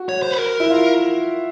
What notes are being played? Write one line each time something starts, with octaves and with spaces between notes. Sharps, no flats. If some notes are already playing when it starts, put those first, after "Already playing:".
Already playing: F#4
C#5
C5
B4
A#4
E4
F4